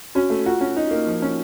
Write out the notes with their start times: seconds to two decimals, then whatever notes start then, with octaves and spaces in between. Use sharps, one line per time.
0.15 C#4 F#4
0.30 A3
0.46 F4 F#4
0.61 C#4
0.77 D#4
0.91 A#3
1.07 F3
1.22 C#4